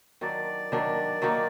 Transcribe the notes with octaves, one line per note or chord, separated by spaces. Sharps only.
D#3 F#3 D4 D5
D#3 F#3 D4
D#3 F#3 A#3 D#4